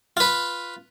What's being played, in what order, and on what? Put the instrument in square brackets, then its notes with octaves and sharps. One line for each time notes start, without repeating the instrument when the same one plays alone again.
[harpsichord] F4 B4